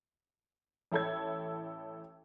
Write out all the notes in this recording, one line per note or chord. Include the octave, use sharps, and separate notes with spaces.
A1 E4 A4 C#5 G#6